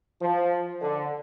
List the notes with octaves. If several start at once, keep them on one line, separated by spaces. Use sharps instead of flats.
F3
D3